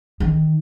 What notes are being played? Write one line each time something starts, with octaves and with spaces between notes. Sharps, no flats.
D#3